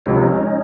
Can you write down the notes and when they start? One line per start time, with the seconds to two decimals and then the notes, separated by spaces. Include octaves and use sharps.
0.06 C#2 C3 F3 C#4 D#4